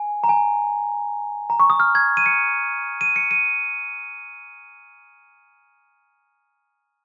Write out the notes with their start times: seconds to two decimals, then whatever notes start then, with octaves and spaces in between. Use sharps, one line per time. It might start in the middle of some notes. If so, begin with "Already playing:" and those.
Already playing: G#5
0.24 A#5
0.29 G#5
1.50 A#5
1.60 C#6
1.70 D#6
1.80 F6
1.95 G#6
2.17 D#7
2.26 C#7
3.01 D#7
3.16 C#7
3.31 D#7